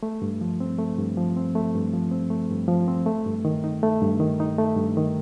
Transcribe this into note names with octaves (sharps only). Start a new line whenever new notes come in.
A3
G2
F3
C4
A3
G2
F3
C4
A3
G2
F3
C4
A3
G2
F3
C4
A3
G2
D#3
D#4
A3
G2
D#3
D#4
A3
G2
D#3